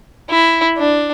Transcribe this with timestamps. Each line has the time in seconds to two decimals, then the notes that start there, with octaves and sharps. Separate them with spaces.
0.30 E4
0.78 D4